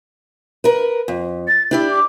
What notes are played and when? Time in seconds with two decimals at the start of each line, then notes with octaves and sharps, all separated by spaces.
0.64 A#4 B4
1.08 F2
1.48 A6
1.71 D4 E4 G4 D5
1.91 D6